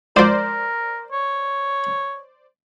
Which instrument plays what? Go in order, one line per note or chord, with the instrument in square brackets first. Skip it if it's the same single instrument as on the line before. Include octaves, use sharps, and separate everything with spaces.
[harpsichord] G#2 F3 [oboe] A#4 [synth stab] C5 D5
[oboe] C#5